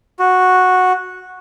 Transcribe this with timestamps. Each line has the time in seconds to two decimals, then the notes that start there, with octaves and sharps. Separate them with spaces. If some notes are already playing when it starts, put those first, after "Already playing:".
0.19 F#4